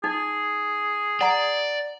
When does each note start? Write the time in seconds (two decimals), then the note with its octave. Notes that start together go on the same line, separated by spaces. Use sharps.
0.04 D#4 G#4
1.21 D5 F#5 A#5